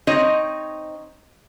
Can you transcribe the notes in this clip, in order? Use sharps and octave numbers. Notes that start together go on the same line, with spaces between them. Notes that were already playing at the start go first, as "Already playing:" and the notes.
C4 D#4 C#5 D#5